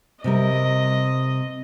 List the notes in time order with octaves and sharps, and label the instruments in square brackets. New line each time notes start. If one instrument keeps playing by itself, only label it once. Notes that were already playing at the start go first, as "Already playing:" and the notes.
[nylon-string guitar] C3 G3 A#4 [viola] D#5